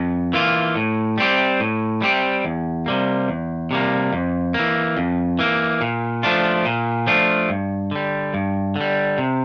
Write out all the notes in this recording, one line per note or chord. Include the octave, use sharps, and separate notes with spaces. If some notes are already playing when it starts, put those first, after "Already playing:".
Already playing: F2
E3 A#3 F4
A2
G3 C4 G4
A2
G3 C4 G4
E2
C3 G3 A#3
E2
C3 G3 A#3
F2
E3 A#3
F2
E3 A#3
A#2
F3 A3 D4 F4
A#2
F3 A3 D4 F4
G2
D3 G3
G2
D3 G3
C3